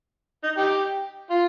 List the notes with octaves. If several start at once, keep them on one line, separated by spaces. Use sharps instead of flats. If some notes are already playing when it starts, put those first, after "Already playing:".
D#4
D#4 G4
F4